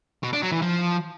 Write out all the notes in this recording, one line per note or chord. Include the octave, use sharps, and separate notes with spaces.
B2
D4
F#3
E3
F3